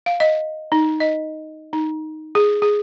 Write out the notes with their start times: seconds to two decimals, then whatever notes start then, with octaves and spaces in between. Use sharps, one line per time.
0.06 F5
0.20 D#5
0.72 D#4
1.00 D#5
1.73 D#4
2.35 G#4
2.62 G#4